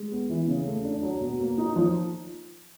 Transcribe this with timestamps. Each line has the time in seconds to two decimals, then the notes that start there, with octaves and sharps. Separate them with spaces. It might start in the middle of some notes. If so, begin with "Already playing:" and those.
Already playing: G#3
0.11 B3
0.30 E3
0.48 C#3
0.66 A3
0.84 D4
1.03 F#3
1.21 B2
1.40 A#3
1.58 D#4
1.76 F3